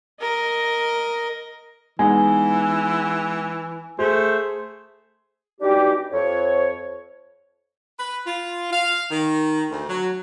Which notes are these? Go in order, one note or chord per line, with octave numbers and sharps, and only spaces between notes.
A#4 D#5
E3 G#3 B3 D#4 G#5
A3 G#4 C5
B2 G3 G#3 D4 D#4 G4
F2 C#5
B4
F4
F5
D#3
D2
F#3